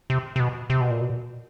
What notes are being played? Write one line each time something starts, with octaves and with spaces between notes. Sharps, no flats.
C3
C3
B2
C3
B2
A#2
B2